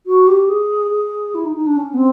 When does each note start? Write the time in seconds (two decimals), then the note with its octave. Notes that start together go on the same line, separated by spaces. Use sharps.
0.06 F#4
0.27 G4
0.48 G#4
0.91 G#4
1.34 E4
1.44 D#4
1.55 D#4
1.66 D4
1.76 C#4
1.93 B3
1.97 C4